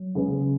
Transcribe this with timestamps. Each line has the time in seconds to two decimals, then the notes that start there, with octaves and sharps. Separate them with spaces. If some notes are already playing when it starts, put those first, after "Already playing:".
Already playing: F#3
0.15 C#3 G#3 B3